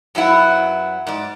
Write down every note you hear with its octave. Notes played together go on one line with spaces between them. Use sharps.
F#2 F#3 B3 E4 F#5
G#2 D5